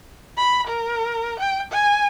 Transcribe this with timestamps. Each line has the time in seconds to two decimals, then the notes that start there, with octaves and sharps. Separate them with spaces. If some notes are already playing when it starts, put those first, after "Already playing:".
0.37 B5
0.67 A#4
1.39 G5
1.72 G#5